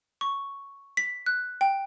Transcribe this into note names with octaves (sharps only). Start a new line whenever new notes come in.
C#6
B6
F#6
G5